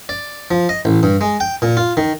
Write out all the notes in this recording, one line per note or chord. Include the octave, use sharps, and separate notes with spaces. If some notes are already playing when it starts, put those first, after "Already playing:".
D5
F3
D#5
A1
G2
G#3
G5
A#2
F4
D#3